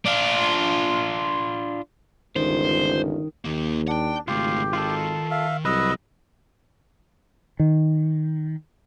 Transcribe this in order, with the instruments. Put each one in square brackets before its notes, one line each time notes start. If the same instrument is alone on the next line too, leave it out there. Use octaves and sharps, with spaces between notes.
[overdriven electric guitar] D4 F4
[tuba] G1 [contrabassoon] C#2 [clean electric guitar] D#3 [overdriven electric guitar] C5
[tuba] D#2 [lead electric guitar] D#3 A#3
[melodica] D4 [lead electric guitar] F#5 G5
[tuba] G#1 [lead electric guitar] C#3 A3 [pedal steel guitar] F4 [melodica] G4
[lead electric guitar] D#3 [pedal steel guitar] F4 A4
[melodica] E5 F5
[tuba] C2 [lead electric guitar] F#3 [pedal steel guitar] B4 [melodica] D#5 E6
[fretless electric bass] D#3